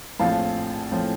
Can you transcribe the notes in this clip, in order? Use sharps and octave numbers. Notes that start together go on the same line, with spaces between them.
A#1 A2 F3 C4 F5 A5
A2 F3 C4